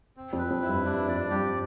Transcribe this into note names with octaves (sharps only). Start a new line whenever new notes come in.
C4
F2
B4
F2
E4
G2
G2 D4
F2 D5
G2 G4